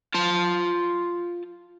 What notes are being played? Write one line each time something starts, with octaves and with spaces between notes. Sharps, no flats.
F4 A5